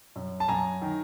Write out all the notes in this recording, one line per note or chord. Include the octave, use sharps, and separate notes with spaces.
F#2
A5
F#2 G#5 A#5
D#3